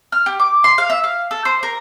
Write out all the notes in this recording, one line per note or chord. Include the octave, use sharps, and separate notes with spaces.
F6
G4
D6
C6
F5
E5
F5
A4
C5
A#4